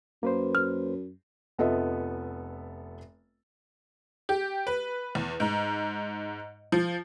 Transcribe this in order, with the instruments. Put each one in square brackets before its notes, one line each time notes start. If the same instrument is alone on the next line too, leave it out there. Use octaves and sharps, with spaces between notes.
[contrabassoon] F#2 [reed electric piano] A#3 B4 C5
[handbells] F6
[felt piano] F1 B3 F4 A4 D#5 E5
[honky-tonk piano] G4
B4
E2
G#2
F3